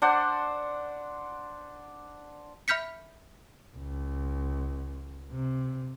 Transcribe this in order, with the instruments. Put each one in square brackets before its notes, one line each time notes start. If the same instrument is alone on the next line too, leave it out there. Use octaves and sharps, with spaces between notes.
[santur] D4 C5 F#5
[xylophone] E5 B5 F6 G6 B6 C#7
[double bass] C#2
C3